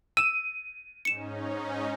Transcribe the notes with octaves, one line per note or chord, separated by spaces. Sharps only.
E6 D#7 E7
G#2 C#4 D#4 C#7 E7